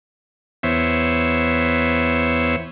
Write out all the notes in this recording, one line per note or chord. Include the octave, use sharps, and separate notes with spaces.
E2 B3 C5 C#5 E5